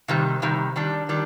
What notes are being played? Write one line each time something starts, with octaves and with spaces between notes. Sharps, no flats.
C3 D#3 G3
C3 D#3 G3
D#3 G3 D4
D#3 G3 D4